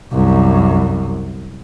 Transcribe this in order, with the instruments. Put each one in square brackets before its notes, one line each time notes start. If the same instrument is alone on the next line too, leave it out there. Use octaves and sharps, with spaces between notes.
[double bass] C2 F#2